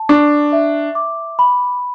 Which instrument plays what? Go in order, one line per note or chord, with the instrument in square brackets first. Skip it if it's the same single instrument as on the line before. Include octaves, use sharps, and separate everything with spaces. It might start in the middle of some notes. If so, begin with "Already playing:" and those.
Already playing: [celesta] A5
[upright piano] D4 [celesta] C#6
[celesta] E5
D6
B5